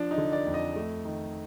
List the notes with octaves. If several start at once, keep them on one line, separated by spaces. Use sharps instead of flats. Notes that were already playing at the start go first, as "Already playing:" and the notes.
Already playing: F3 D4
D#4
D3
D5
F2
D#5
A3
D#3